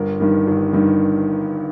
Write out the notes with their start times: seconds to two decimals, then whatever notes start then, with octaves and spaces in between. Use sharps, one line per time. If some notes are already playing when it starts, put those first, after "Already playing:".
Already playing: G1 A#4
0.20 G2 D#3
0.47 G1
0.73 G2 D#3